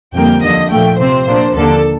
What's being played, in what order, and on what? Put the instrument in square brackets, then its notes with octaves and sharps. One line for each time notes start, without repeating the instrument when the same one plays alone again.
[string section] F2 D3 G3 A#3 G5
D#2 D3 F3 D#5
A#2 F3 A3 G5
C3 F3 C4 C5
A#2 F3 A#3 D4
D#2 D3 F3 A#3 D4 A4